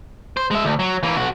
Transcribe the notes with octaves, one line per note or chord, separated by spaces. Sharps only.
C5
G#3 E5
D2
F#3
E3 A#3
B1 F#4